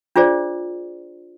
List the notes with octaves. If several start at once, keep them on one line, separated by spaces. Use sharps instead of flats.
D4 F4 G#4 C5 D5